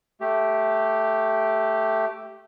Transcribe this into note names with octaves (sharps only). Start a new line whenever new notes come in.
A3 G4